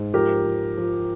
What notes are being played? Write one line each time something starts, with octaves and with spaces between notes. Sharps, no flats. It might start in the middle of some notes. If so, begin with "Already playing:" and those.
Already playing: G#2
F3 G4 A#4
F3
F3